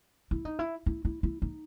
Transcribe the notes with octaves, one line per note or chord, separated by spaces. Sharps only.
E4
D#4
E4
E4
E4
E4
D#4